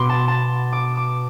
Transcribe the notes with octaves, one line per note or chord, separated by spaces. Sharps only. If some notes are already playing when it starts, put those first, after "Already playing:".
Already playing: B2 B3 C6 D6
A5
A5
D6
D6